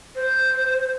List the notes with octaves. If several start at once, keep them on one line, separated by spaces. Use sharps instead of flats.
C5